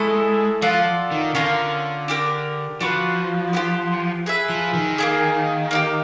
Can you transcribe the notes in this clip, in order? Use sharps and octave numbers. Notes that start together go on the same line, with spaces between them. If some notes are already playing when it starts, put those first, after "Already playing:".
Already playing: G#3 A3 E4 A4
F3 F4 A4 D5 F#5
D#3
D3 C#4 F4 A#4
D4 G4 A#4
F3 D4 F#4 B4
B3 E4 G4 C5
G#4 B4 E5
F3
D#3
A#3 D#4 G#4
A#3 D#4 G4